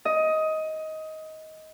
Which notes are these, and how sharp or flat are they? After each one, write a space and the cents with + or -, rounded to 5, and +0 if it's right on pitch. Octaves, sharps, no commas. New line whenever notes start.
D#5 +15